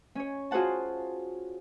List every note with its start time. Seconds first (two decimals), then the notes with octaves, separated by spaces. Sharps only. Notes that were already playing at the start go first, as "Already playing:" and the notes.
0.15 C#4 C#5
0.51 F4 F#4 G#4 C5 F#5 A5